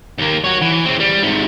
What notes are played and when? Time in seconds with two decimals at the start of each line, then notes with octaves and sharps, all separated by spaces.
0.19 D#2 A#3
0.44 F#4 C#5
0.62 E3
0.85 C#3 C4
1.00 G3
1.23 G#2 C3